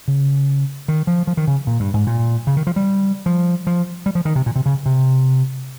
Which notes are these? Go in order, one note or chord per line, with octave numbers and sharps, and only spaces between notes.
C#3
D#3
F3
F3
D#3
C#3
A#2
G2
G#2
A#2
C#3
D#3
F3
G3
F3
F3
G3
F3
D#3
C3
A#2
C3
C#3
C3